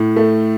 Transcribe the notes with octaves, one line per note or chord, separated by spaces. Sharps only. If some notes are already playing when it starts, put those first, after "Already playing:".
Already playing: A2
A3